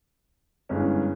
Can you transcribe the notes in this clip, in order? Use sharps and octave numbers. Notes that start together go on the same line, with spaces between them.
G1 G2 E3 G#3 C#4